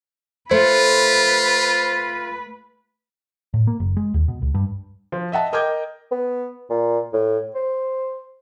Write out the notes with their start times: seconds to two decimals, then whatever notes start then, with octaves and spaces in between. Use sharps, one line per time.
0.51 A3 F4 B4 C5
3.54 A2
3.67 A#3
3.80 F#1
3.97 G#3
4.14 D#2
4.28 B2
4.42 C#2
4.55 G2
5.12 F3
5.32 D#5 E5 F#5 A5
5.53 A#4 D#5 G5 D6 G6 G#6
6.11 B3
6.70 A#2
7.13 A2
7.55 C5